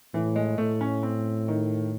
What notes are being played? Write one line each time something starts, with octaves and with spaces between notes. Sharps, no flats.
A2 E3
G#3
A2 A3
C#4
C4
D#3